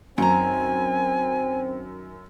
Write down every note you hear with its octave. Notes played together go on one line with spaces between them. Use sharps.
F#2 D#3 C4 G#5 A#5